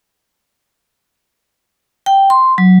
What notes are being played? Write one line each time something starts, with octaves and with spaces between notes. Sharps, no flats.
G5
C6
F#3